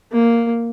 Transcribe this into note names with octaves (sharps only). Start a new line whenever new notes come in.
A#3